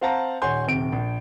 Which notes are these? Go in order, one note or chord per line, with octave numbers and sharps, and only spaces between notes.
C4 C5 F5 F#5 A5 A#5
D#1 C#5 F#5 G#5 C6 G6
D#1 C3 D7
A#1